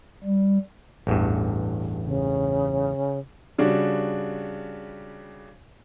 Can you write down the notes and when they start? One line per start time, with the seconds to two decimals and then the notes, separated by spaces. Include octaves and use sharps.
0.23 G3
1.07 A1 E2 G2
2.04 C#3
3.58 C#3 G3 D4 F#4